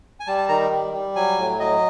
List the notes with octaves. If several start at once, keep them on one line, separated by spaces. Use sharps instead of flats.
G#5
G3 A5
A5
D#3 A#5
G3
G3
F#3 G#5
A2
F#3 D#5